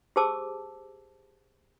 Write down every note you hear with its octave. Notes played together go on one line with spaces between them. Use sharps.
G4 G#4 C5 A5 D6 E6